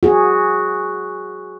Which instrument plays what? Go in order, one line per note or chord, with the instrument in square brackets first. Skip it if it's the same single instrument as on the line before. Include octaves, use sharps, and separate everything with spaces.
[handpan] F#4 G#4